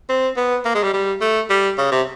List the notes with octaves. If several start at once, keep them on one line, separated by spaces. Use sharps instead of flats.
C4
B3
A#3
G#3
G3
G3
A3
G3
C#3
C3